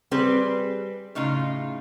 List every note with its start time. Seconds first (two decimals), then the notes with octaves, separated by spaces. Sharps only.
0.11 G3 C4 G#4 B4
1.15 A2 C#3 D#4 F4